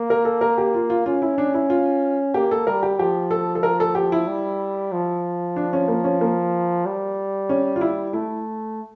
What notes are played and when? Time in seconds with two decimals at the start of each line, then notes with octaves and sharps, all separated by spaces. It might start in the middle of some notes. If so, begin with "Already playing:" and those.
Already playing: A#3
0.10 A#4
0.25 A4
0.41 A#4
0.58 G4
0.74 F4
0.90 F4
1.06 C#4 F4
1.22 E4
1.38 D4
1.54 E4
1.70 F4
2.34 A#3 G4
2.51 A4
2.67 G3 A#4
2.83 G4
2.99 F3 G4
3.31 A4
3.55 A4
3.63 A#4
3.80 A4
3.95 G4
4.12 E4
4.27 G3
4.92 F3
5.56 D4
5.73 C#4
5.88 A#3
6.04 C#4
6.21 A#3
6.85 G3
7.49 C#4
7.76 F4
7.81 E4
8.13 A3 E4